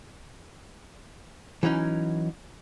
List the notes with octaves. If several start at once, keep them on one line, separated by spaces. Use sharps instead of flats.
E3 F#3 C#4 D#4